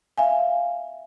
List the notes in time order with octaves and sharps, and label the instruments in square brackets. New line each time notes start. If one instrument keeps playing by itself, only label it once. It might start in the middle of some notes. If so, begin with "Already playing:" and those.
[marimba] E5 F5 G#5